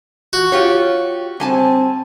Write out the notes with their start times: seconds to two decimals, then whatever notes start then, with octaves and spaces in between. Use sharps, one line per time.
0.33 F#4
0.52 F4 G4 C#5
1.40 G3 C4 G#5 A5